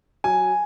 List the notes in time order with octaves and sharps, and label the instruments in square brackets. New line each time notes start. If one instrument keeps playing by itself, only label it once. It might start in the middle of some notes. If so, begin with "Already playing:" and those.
[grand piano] F#3 G#5